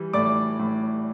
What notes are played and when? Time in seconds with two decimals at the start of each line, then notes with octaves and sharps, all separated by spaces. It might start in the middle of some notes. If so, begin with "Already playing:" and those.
Already playing: E3 G3
0.13 A2 D5 D6
0.60 A2